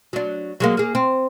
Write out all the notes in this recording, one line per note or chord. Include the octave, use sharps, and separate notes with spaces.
F#3 D4
F#3 G#3 A#3
A#3 G#4
C4